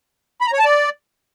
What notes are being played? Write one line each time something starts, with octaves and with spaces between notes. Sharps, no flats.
B5
A#5
C#5
A5
D5